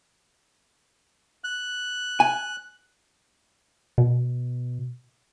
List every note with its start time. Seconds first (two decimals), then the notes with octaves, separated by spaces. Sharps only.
1.44 F#6
2.20 G#5
3.98 B2